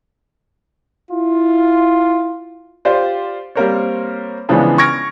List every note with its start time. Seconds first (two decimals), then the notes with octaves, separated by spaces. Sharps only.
1.11 E4 F4
2.85 F4 G4 C5 D5
3.55 G3 A#3 C4 A#4 C5 C#5
4.49 C#3 E3 F3 G#3 B3 D4
4.78 C#6 F6 G#6 A#6 D7